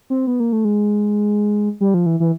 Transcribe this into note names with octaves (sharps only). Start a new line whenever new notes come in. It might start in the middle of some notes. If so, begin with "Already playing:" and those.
C4
B3
A#3
A3
G#3
G3
F3
E3
E3